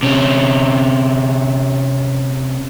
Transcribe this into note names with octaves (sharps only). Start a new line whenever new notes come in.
C3 C#4